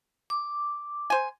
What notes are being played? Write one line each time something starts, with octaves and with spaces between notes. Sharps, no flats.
D6
C5 G#5